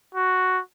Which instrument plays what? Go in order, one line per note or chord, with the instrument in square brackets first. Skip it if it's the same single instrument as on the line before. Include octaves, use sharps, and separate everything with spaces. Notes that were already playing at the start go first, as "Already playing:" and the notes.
[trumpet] F#4